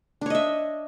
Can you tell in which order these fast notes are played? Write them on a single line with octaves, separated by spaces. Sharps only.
D4 C#5 D#5 E5